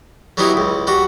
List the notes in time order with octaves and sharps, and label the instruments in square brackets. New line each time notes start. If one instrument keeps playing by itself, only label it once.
[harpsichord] F#3 G3 B3 D#4 E4
C#2
G3 F#4